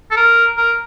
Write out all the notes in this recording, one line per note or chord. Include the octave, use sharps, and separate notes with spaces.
A4
A#4
A#4